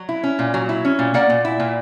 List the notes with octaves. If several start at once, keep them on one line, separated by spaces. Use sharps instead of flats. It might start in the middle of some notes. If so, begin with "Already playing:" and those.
Already playing: F#3
E4
C#4
A#2
F#3
E4
C#4
A#2
A#3 D5 F#5
A#2
E4
A#2